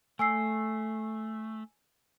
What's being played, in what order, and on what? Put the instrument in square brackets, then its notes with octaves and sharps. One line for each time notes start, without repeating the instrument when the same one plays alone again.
[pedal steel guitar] A3 [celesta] G#5 E6 C7